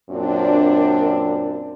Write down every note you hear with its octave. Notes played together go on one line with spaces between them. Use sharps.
F#2 A#2 C4 D4